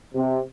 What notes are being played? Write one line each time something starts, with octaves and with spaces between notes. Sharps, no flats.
C3